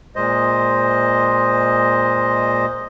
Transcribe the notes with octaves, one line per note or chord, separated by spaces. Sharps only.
A#2 G#3 C5 D#5